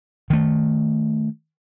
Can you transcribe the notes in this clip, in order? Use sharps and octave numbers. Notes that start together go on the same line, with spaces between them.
D#3 A3